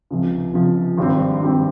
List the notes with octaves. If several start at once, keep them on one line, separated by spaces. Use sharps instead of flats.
C#2 C3 F3
C#2 C3 F3
G#1 G2 G3 C4
G#1 G2 G3 C4